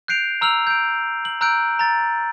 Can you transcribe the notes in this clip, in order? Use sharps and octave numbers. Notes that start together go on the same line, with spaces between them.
F#6 G6 C7 D7 F7
A#5 E6 F6 F7 F#7
G6 D7
F#7
A#5 E6 F#6 G6 D7
A#5 A6